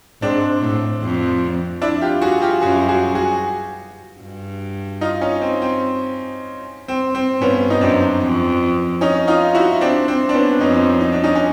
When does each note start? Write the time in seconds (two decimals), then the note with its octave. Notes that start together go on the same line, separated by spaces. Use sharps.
0.21 G#2 C4 D4
0.62 A2
1.01 F2
1.82 D4 E4
2.01 F4 G4
2.22 F#4 G#4
2.42 F4 G4
2.62 F#2 F#4 G#4
2.88 F#4 G#4
3.15 F#4 G#4
4.21 G2
5.01 D#4 F4
5.21 C#4 D#4
5.41 C4
5.62 C4
6.88 C4
7.15 C4
7.41 G2 B3 C#4
7.70 D#4
7.81 F#2 C4 D4
8.21 F2
9.01 C#4 D#4
9.28 D#4 F4
9.55 E4 F#4
9.81 C4 D4
10.08 C4
10.29 D4
10.34 B3 C#4
10.61 F2 C#4 D#4
11.01 D#4
11.12 D4
11.24 C#4 D#4
11.35 C#4